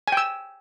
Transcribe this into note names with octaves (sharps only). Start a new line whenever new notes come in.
G5 G#5 E6